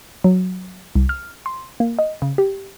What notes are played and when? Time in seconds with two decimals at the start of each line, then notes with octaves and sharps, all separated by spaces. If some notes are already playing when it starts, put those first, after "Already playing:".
0.24 F#3
0.95 C2
1.09 F6
1.46 C6
1.80 A#3
1.99 D#5
2.22 C#3
2.38 G4